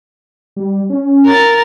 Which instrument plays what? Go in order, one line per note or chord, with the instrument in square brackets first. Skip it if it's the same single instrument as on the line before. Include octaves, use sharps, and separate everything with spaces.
[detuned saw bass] G3
C#4
[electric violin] A#4 A6